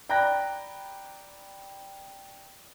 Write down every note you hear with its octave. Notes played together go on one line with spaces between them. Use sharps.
D5 G5 A#5 B5 F#6 A#6